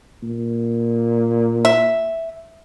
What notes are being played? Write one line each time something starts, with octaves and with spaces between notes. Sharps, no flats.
A#2
E5